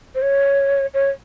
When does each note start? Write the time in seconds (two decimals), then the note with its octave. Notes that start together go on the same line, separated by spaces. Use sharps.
0.15 C5
0.22 C#5
0.94 C#5